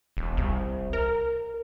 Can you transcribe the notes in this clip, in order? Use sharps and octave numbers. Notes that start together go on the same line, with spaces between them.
E1
C2
A#4